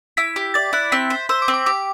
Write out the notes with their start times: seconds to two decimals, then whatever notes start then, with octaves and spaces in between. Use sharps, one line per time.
0.17 E4 B6
0.36 G4
0.54 D5 A6
0.73 E4 F#6
0.92 C4 B6
1.10 C5
1.29 C5 E6
1.42 D6
1.48 C4
1.54 D6
1.66 G4 D6